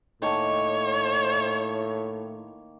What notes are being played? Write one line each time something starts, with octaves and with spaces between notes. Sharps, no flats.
A2 D#3 A#3 C#5 A5